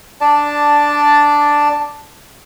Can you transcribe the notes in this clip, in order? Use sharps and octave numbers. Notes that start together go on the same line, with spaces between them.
D4 D5 A5